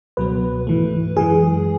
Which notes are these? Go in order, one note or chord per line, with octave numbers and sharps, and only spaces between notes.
C#2 B2 F#3 B3 B4
G#2 E3 A3
F#2 E3 G#3 G#4